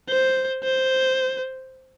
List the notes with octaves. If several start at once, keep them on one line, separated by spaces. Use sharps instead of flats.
C5
C5